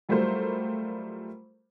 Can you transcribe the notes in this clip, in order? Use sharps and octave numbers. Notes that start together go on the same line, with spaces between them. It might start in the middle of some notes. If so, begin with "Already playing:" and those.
F#3 G3 A3 F4 A#4 C5